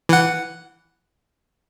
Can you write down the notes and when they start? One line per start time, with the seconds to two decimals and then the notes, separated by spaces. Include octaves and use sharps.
0.09 E3 F#5